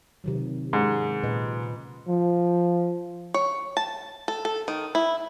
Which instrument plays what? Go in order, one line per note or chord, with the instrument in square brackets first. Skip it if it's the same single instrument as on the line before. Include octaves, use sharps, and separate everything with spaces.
[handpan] C3 D#3 F#3
[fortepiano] G#2 [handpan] C#4
[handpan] A#2 B4 D#5
[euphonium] F3
[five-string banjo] C#5
A5
A4
A4
D#3
E4